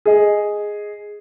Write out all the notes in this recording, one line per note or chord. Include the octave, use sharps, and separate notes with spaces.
G#4 D#5